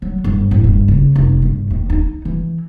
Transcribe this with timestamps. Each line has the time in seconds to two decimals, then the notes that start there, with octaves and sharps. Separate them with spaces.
0.02 F#3
0.24 G1
0.51 A1
0.64 G2
0.88 C#3
1.16 F1
1.42 G1
1.71 D#2
1.90 D#4
2.25 E3